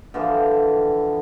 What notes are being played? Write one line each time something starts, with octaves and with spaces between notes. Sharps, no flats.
D3 E3 F3 G3